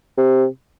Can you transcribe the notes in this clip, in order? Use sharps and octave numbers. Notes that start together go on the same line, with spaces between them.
C3